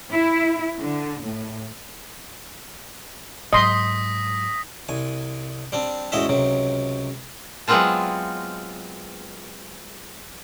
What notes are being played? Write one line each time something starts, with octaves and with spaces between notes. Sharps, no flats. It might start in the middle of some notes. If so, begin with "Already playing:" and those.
E4
D3
A2
G#2 F#3 D#5 C6 D#6 A#6 B6
C2 G#5
G3 C4 D4
A1 E2 G#3 F#4 D#5 E5
C#2 C3 F#3
F#3 G#3 B3 C4 F4 A5